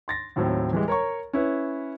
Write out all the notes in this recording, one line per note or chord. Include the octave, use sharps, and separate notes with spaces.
C6 A6 A#6
D#2 A2 F#3 C4
E3 G3 G#3
A#4 C#5 A#5 C#6
C#4 E4 B4